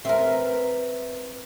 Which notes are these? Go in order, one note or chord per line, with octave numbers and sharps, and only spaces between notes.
C4 A#4 B4 E5